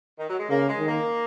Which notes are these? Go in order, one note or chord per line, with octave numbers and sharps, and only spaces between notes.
D#3
F#3
G#3
C#3 A#3
G#3
D#3
A#3